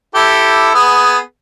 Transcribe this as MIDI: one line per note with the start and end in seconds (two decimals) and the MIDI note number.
0.15 0.70 64
0.15 0.70 67
0.15 0.70 69
0.75 1.18 59
0.75 1.18 68